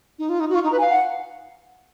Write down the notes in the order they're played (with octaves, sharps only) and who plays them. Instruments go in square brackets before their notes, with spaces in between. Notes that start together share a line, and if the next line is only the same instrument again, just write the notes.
[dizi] D#4
F4
D#4
F#4
[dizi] F4 [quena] C#6
[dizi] D#4
[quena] A#5
[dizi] B4
[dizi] F5 [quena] G#5
[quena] F#5